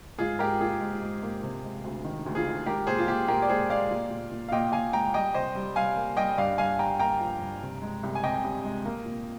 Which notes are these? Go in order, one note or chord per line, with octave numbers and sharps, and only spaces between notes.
G#2 F4 G#4
G#2 G4 A#4
A#3 F4 G#4
G#2
G#2
A#3
C3
G#3
D2
D#3
D2
F4 G#4
D#3
G#3 G4 A#4
A#2 G#4 C5
F4
A#2 G4
A#2 G4 A#4
D5
G#3 G#4 C5
G#3 D5 F5
A#2
A#2
A#2
F5
A#2 D#5 G5
A#2 F5 G#5
G#3 G5 A#5
G3 D#5 G5
C3 C5 D#5
G3
G3 F5 G#5
A#3
G3 D#5 G5
G2 D5 F5
G2 F5 G#5
G2 G5 A#5
A#3 G5 A#5
F3
G2
C3
G#3
C2
G#5
C3 D#5 G5
C2
G#3
A#3
A#2